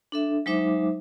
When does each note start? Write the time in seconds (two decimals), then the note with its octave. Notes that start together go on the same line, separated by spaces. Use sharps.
0.12 D4 A4 E5
0.46 F#3 G#3 D#4 C5 E5 D6